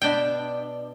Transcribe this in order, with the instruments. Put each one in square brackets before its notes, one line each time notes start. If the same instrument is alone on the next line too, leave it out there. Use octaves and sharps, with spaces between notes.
[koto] B2 B3 D4 G5